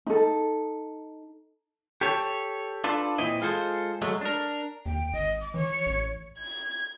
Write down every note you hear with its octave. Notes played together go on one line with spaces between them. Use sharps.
D#4 A4
G4 A4 C#5
D4 F4 A4 B4
A#2 E3 C4 E4 D#5
G#3 F4 G#4 A4 C5
F#3 G#3 A3
D4 A#4
D#2 G5
G#1 D#5
D6
E3 C#5
A1
G#6